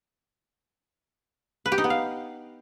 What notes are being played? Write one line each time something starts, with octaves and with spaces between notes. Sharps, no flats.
B4
G4
D#4
B3
F5